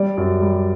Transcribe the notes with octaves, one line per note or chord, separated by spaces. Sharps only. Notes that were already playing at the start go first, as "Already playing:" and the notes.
Already playing: G3 D5
F#2
G3